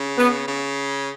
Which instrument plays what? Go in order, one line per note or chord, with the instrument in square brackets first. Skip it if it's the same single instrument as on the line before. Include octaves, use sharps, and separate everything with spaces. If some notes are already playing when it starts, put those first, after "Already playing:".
Already playing: [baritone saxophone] C#3
[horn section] B3
[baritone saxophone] C#3